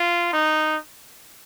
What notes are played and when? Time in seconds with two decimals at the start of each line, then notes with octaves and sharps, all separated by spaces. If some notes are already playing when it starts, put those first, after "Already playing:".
Already playing: F4
0.33 D#4